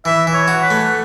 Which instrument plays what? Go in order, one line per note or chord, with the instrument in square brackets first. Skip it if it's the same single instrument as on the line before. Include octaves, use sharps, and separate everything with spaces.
[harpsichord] E3 [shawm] E5
[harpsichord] E3
[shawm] C#5
[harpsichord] F#4
[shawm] B4
[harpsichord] A3